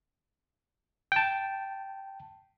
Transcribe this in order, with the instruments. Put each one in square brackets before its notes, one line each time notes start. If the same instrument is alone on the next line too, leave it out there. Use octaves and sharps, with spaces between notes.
[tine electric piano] G5 A5